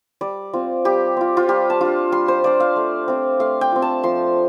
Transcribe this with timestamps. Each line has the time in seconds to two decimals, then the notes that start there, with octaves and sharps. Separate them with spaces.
0.21 G3 D5
0.53 C4 F4
0.85 G3 G4
1.17 C4 F4
1.37 F4
1.48 G3 G4
1.70 A5
1.81 D4 F4
2.12 G3 C6
2.28 C5
2.44 D4 F4 D5
2.60 F5
2.76 A3
3.08 C4 F4
3.40 A3 F5
3.61 G5
3.72 C4 F4
3.82 A5
4.03 F3 C6